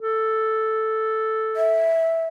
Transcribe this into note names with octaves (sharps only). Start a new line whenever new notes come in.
A4
E5